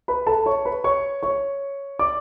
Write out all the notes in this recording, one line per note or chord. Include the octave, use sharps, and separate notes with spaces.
B4 B5
A4 A5
C#5 C#6
B4 B5
C#5 C#6
C#5 C#6
D5 D6